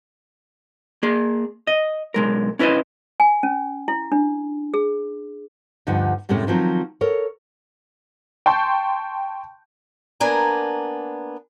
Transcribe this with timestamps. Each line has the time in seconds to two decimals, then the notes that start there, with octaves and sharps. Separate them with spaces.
1.03 A#3 G#4
1.67 D#5
2.14 B1 G#3 A#4
2.59 C#4 E4 B4 C5 D#5
3.20 G#5
3.43 C#4
3.88 E4
4.12 D4
4.74 G#4
5.87 D2 G2 D3 F3 D#4 F#5
6.29 F#2 A2 C3 G#3 A3 C#4
6.47 D#3 F3 F#3 C4
7.01 A4 A#4 C#5
8.46 G5 A5 C6 C#6 G6
10.20 A#3 B3 D4 G#5 A#5